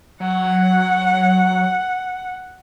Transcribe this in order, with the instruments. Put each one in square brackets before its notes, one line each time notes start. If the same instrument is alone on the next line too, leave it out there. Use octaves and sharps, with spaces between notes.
[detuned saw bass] F#3 [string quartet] F#5